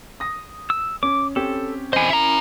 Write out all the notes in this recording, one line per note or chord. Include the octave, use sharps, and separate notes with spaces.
D#6 A#6
E6
C#4 D6
C4 C#4 G4 A4
E3 C5 D#5 G#5
C#4 E4 A#4 E5 A#5